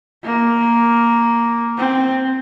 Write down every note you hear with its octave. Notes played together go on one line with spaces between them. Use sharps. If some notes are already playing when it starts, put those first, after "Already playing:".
A#3
C4